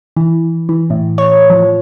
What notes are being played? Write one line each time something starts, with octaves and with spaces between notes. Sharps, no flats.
E3
E3
A2
C#5
F3